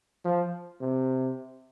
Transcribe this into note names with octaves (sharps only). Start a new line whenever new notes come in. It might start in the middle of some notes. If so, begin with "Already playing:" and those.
F3
C3